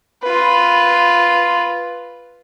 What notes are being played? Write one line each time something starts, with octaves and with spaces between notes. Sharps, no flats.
F4 B4